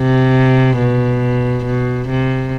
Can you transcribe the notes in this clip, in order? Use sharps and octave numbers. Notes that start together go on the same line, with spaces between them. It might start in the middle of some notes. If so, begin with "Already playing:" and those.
Already playing: C3
B2
B2
C3